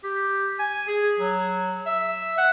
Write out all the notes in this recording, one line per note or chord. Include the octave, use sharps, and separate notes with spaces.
G4
G#5
G#4
F#3
E5
F#5